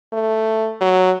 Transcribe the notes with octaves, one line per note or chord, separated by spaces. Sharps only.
A3
F#3